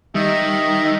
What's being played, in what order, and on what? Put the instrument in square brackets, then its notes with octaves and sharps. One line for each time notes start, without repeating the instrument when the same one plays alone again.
[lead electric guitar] D#3 [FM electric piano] G3 [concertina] D#5 E5